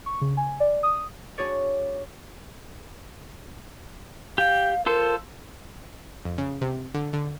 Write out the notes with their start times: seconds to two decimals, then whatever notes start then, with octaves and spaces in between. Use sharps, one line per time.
0.06 C#6
0.21 C#3
0.37 G#5
0.60 D5
0.83 D#6
1.38 D4 F#4 G#4 C#5 D5
4.38 G4 F5 G5
4.86 F4 A4 A#4 C5
6.25 F2
6.38 C#3
6.61 C3
6.94 D3
7.13 D3